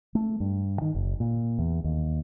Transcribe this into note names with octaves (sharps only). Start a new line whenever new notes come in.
A3
G2
D#3
F#1
A#2
E2
D#2